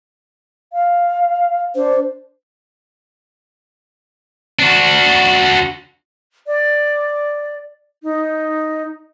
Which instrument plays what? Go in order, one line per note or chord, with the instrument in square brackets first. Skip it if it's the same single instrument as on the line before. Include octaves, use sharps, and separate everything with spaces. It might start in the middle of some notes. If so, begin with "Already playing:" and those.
[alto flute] F5
[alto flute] D4 [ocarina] C5
[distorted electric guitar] D4 F#4
[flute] D5
D#4